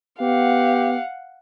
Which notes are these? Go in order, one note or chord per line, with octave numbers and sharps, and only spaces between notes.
B3 G4 F5 F#5